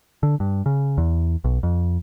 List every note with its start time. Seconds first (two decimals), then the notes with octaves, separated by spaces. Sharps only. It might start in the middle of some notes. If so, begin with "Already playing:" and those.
0.23 D3
0.40 G2
0.66 C#3
0.98 E2
1.44 B1
1.63 F2